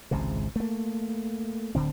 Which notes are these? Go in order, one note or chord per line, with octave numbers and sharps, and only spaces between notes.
G#1 C#2 G#2 C3
A3 A#3
D1 D3 C4